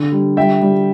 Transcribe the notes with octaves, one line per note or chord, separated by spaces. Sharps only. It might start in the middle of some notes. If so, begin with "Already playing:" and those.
Already playing: D3
G3
G3 E5 G5
G3